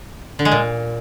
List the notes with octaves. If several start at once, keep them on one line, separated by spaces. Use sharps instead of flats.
D3
G#3
A#2